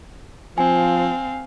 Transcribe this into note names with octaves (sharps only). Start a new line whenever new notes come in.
F3 C4 F5 G#5